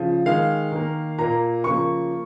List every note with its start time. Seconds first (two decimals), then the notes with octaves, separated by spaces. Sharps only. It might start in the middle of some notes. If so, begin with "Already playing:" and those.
Already playing: C#3 F3
0.26 D#3 G#3 F5
0.72 D#3 A#3
1.18 A#2 A#3 A#5
1.64 C#3 F3 A#3 C#6